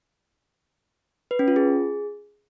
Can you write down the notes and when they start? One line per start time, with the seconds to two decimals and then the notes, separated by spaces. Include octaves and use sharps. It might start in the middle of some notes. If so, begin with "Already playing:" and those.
1.31 B4
1.39 C#4
1.48 F4
1.56 G#4